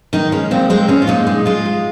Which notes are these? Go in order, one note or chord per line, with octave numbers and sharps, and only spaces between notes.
D#3 D#4
G#3 C#4
A#2 C4
G#3 C4
G#3 C#4
F4
A#2 D#4
G#3
G#3 F4
G#3